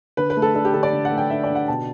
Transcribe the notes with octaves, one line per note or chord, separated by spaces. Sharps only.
D3 B4
B4
A3
A4
D4 A4
G4
D3 A4
D5
D3
F#5
A3
G5
D4 E5
D5
D3
F#5
B2 A5